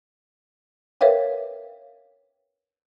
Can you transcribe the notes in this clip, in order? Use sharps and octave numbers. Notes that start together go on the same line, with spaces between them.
A#4 B4 C#5 E5 F5 G5